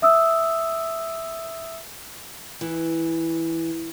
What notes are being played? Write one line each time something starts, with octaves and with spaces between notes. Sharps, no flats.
E5 D#6 E6
E3